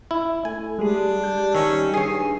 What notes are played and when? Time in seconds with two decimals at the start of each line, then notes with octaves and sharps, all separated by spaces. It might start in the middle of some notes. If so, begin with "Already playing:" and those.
0.11 E4
0.45 A3 G#5
0.79 G3 G#3 D4 G4 G#4
1.24 G3 G6
1.55 D#3 C#4 E6
1.94 G2 D#3 G#4 C#5 G#5 C7 D#7